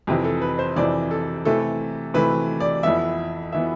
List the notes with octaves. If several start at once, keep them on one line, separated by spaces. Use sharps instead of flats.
F2 C3 E3 G4
A4
B4
C5
F2 C3 E3 D5
A4
C3 E3 A3 A4
C3 E3 A3 B4
D5
F2 E3 B3 E5
E3 B3 E5